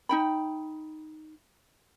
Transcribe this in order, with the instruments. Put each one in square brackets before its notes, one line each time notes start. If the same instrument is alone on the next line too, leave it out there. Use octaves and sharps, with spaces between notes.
[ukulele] D#4 G5 B5